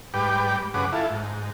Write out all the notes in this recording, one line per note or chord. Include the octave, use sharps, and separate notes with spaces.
G#2 G3 B4 G5 D6
F#2 C#3 G#4 B4 F#5 D6
E4 F4 A4
G#2